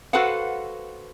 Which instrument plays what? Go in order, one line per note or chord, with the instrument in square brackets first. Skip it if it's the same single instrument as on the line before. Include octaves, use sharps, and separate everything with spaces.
[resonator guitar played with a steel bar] F#4 A4 B4 C5 F5 F#5